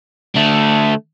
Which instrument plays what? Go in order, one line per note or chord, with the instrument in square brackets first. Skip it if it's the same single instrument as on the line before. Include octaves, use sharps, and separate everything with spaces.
[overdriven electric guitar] D3 A3